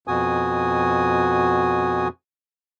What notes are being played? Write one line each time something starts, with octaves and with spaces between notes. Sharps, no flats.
F2 B2 F#4 G#5 D#6